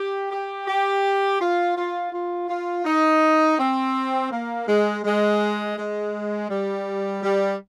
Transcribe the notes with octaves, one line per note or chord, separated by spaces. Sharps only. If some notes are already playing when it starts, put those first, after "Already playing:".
Already playing: G4
G4
G4
F4
F4
F4
F4
D#4
C4
A#3
G#3
G#3
G#3
G3
G3